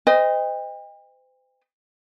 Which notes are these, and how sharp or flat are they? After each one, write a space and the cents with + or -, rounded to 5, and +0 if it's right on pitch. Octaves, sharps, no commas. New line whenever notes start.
C5 -40 D#5 +0 G5 +40